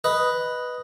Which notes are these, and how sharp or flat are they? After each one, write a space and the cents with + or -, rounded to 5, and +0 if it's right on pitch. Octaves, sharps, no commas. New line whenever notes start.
B4 +0 D#5 +0